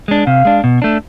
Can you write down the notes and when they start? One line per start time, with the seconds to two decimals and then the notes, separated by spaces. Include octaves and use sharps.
0.08 G#3 D4
0.27 C3 F5
0.45 G#3 D4
0.64 B2
0.82 A3 D4